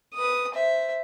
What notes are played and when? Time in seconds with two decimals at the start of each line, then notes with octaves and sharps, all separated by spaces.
0.14 B4 D#6
0.52 C5 E5